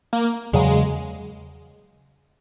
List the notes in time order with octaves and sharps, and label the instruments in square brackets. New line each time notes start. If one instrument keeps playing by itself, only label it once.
[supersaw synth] A#3
[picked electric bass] E2 C#3 F#3 [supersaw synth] G#3